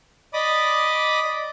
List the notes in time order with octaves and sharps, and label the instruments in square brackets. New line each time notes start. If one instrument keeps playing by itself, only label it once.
[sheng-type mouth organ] D5 D#5 B5 D6 D#6